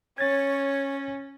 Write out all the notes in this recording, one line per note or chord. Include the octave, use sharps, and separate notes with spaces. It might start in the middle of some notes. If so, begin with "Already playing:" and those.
C#4 C#5 G#6 A6